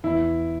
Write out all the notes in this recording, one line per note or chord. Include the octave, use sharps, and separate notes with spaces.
E2 E4